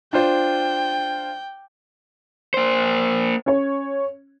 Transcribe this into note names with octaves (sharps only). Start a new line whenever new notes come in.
D4 F4 C5 G5
A#3 C5
C#4 C#5